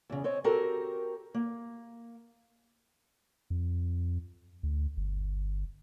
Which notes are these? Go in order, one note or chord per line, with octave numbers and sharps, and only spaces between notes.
E2 C#3
C4 C#5 D#5
C4 F#4 G4 A4 A#4
A#3
F2
D2
G1